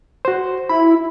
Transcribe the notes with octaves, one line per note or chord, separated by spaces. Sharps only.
F#4 C5
E4 B5